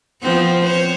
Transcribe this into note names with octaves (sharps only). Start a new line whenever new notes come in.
F3 B3 C4
C5 C#5